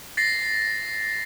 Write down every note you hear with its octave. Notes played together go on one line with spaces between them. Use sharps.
A6 A#6 C7